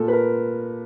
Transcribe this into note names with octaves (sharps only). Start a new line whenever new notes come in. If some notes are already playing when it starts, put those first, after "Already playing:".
Already playing: A#2 A4
B4
A#4